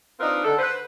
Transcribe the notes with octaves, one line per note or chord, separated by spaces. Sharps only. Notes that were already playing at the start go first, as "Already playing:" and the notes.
C4 D4 D#4 F4 A#4 B4
D3 A4
B4 C5